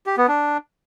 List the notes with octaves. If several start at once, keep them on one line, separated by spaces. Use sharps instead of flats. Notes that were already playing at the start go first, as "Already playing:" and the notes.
G4
B3
D4